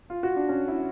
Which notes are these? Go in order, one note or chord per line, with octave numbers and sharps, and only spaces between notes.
F4
F#4
D4
C#4
E4